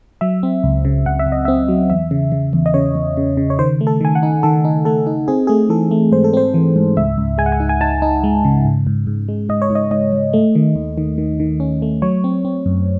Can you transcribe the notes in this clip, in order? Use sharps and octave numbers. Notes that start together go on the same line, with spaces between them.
F#3 E5
C4
C#2
C#3
C#2 F#5
E5
C#2
D#5
C4 E5
F#3
E2 E5
C#3
C#3
E2
D#5
C#3 C#5
E2
C#3
C#3
C#5
D#3 C5
A3
A4
D#3 G#5
F#5
D#4
D#3 A4
D#4
A3 A4
D#4
C4 G#4
A3 G#4
E3 A4
A3
G#2 C5
A4
C4 C5
E3
G#2
C#2 E5
C#2
G#3 G#5
F#5
G#5
D#4
G#5
D#4 A5
D#4
G#3
C#3
G#2
G#2
G#2
G#3
G#2 D#5
C#5
G#2
D#5
G#2 D#5
G#2
A3
D#3
D#2
D#3
D#3
D#3
C#4
A3
F#3 C#5
C4
C4
F#2